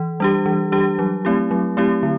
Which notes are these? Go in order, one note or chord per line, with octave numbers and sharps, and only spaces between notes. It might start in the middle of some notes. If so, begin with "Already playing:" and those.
Already playing: E3
G3 D4 G4
E3
G3 D4 G4
F#3
A3 C4 E4 G4
F#3
A3 C4 E4 G4
D3